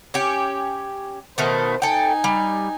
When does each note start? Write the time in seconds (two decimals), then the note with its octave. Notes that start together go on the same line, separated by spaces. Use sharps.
0.14 C#4 G4
1.38 B2 D#3 A3 C5
1.82 D#4 A4 G5 G#5
2.24 G3